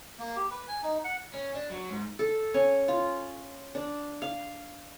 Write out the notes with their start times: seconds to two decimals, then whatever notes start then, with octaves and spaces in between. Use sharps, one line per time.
0.19 A#3
0.36 G4
0.51 B4
0.68 G#5
0.83 D#4
1.04 F#5
1.34 C#4
1.54 D4
1.70 F#3
1.90 G#2
2.19 A4
2.54 C#4
2.88 F4
3.75 D4
4.22 F5